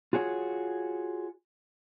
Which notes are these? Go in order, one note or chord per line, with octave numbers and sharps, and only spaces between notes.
F4 F#4 G#4 C#5